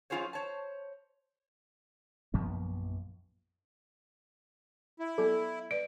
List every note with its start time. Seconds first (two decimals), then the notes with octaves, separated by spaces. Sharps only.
0.10 F#2 C#4 F4 G#4 C5 C#5
0.33 C5 C#5 A5
2.34 A#1 F#2 F3 B3
5.00 E4
5.18 F#3 B3 A4
5.71 B4 D5 D7